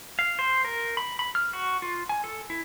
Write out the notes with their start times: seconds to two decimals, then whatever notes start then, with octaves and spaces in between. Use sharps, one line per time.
0.19 F5
0.39 C5
0.65 A#4
0.97 B5
1.19 B5
1.35 F6
1.53 F#4
1.82 F4
2.09 G#5
2.24 A4
2.50 E4